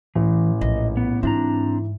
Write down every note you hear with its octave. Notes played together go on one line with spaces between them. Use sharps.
A1 E3
A#1 D#5
B3
G#2 E3 C4 D4 A#5